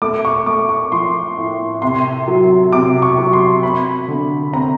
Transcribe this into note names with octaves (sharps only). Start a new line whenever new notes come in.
A3 D6
C#6
A3 D6
C#6
F3 C6
A2
C3 C6
F#3
C3 D6
C#6
F#3
C6
C4 B5
D3
C4 A#5